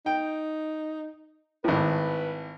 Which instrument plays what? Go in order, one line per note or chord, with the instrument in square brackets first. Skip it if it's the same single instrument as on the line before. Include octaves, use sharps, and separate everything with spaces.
[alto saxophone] D#4 [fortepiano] G5
[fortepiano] G#1 A2 [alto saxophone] B4